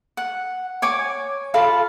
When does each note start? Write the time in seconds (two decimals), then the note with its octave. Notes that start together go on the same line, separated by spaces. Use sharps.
0.17 F#5
0.82 C#5 G#5 D6
1.54 F4 A4 F5 B5